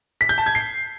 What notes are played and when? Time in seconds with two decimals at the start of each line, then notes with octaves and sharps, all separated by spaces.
0.21 B6
0.29 G6
0.38 A5
0.46 G#6
0.55 C7